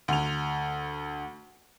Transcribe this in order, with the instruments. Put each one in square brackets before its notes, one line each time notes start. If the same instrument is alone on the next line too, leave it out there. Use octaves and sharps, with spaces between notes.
[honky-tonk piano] D2 F7